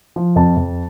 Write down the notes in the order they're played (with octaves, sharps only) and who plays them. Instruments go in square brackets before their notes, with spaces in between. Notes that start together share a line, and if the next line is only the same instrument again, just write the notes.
[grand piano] F3
F2 A5
F2